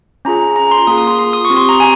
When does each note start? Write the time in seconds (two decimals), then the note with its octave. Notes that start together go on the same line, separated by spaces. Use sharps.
0.25 C#4 F4 G#4 A#5
0.56 A#5
0.71 C6
0.87 A#3 F4 G#4 D#6
0.98 D#6
1.07 C6
1.19 C6
1.33 D#6
1.45 C#6
1.50 C4 G4
1.57 C6
1.69 A#5
1.80 G#5